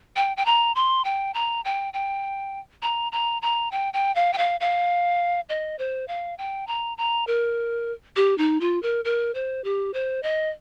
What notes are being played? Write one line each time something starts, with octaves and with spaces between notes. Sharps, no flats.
G5
G5
A#5
C6
G5
A#5
G5
G5
A#5
A#5
A#5
G5
G5
F5
G5
F5
F5
D#5
C5
F5
G5
A#5
A#5
A#4
G4
D#4
F4
A#4
A#4
C5
G4
C5
D#5